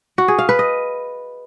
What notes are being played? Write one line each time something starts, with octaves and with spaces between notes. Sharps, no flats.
F#4
G#4
F5
B4
D#5